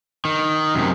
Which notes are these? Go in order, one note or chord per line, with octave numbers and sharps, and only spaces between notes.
D#3
F#2 C3